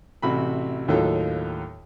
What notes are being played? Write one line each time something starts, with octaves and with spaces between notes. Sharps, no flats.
A1 C3 F#4 B5
D#2 A2 F#3 F4 A4